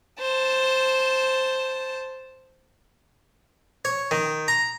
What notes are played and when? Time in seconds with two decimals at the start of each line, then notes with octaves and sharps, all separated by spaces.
0.20 C5 A5
3.85 C#5
4.11 D#3
4.48 A#5